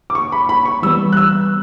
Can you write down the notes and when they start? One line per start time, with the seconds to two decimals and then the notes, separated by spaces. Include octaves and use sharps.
0.10 D6
0.15 C#6
0.32 B5
0.49 B5
0.65 C#6
0.83 E3 G3 B3 E6
1.13 F#6
1.17 E6